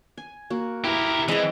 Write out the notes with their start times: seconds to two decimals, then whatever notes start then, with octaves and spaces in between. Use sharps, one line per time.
0.18 G#5
0.50 A#3 F#4
0.84 E4 G4 A#4 B4 A5
1.28 E3 G#3 B3 C4 E4 D#5 G5